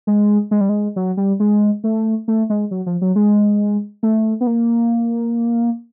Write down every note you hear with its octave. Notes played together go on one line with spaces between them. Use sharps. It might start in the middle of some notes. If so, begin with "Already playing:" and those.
G#3
G#3
G3
G#3
F#3
G3
G#3
A3
A3
G#3
F#3
F3
F#3
G#3
A3
B3
A#3